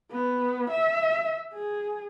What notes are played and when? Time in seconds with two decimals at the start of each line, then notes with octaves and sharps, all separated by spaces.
0.12 B3
0.71 E5
1.54 G#4